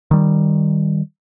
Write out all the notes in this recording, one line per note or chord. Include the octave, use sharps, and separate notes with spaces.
D#3 G3